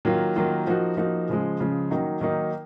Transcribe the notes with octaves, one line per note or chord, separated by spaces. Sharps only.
D#3 F#3 A#3 F4
D#3 F#3 A#3 F4
F3 A#3 D#4 F#4
F3 A#3 D#4 F#4
C#3 F3 G#3
C#3 F3 G#3
D#3 F#3 A#3 D#4
D#3 F#3 A#3 D#4